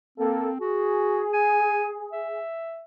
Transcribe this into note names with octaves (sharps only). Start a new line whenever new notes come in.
A#3 C4 A4
F#4 G#4
G#5
E5